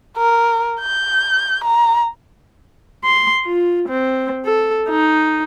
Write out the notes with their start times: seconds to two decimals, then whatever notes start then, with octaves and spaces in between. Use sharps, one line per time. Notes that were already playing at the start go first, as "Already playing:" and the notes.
0.17 A#4
0.81 G6
1.64 A#5
3.05 C6
3.46 F4
3.88 C4
4.45 A4
4.90 D#4